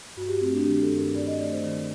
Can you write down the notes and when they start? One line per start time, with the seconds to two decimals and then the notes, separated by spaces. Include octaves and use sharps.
0.16 G2 F#4
0.29 G4
0.41 A3 C4
0.53 D4
0.65 D#3 G4
0.82 A4
0.90 G2
0.98 A#4
1.15 G2 D5
1.27 D#5
1.39 A3 D5
1.52 C5
1.64 D#3 A#4